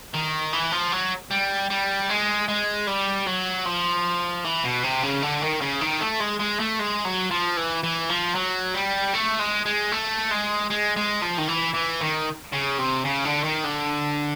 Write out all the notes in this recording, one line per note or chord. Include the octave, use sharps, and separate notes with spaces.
D#3
E3
F3
F#3
G3
G3
G#3
G#3
G3
F#3
F3
E3
B2
C3
C#3
D3
D#3
C#3
D#3
A3
G#3
G#3
A3
G#3
F#3
F3
E3
E3
F3
F#3
G3
A3
G#3
G#3
A3
G#3
G#3
G#3
F3
D#3
E3
E3
D#3
C#3
C3
C#3
D3
D#3
D3